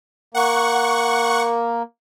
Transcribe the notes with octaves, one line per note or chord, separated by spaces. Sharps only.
A#3 F#5 C#6